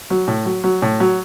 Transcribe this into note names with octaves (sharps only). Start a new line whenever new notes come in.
F#3
A2
F#3
F#3
A2
F#3